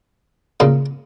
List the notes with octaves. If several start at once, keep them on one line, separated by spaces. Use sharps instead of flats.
A#2 C#3